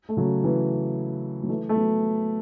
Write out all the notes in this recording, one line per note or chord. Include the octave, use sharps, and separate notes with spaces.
A3
C#3 F#3
E3 A3
F#3
E3 A3
A3
F#3 B3